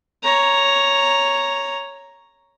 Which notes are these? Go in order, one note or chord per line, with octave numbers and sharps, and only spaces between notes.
C#5 A#5